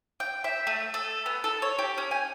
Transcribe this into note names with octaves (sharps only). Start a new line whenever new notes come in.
G5
E5
A3
A4
B3
A4
C#5
G4
C#4
G#5